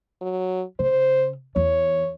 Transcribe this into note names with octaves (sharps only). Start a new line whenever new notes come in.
F#3
C#3 C5
E2 C#5